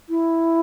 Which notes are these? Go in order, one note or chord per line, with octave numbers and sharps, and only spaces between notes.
E4